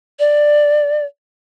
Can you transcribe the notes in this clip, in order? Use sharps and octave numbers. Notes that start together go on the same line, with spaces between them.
D5